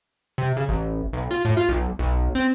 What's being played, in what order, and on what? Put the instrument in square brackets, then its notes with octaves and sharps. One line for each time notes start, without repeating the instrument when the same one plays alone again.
[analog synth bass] C3
C#3
A1
B1
F4
A2
F4
B1
B1
C4